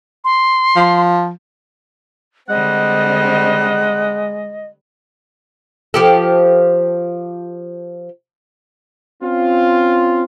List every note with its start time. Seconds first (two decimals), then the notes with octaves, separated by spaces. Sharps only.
0.24 C6
0.76 F3
2.49 D3 G3 G#3 C4 D#5 F#5
5.94 F3 G4 A4
9.23 C4 C#4 F4